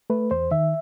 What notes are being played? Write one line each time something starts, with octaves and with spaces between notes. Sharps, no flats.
A3 B4
E2 C5
D#3 E5